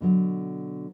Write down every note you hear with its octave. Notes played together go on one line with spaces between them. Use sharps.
B2 D3 F#3